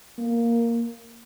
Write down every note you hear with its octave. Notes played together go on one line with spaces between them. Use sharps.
A#3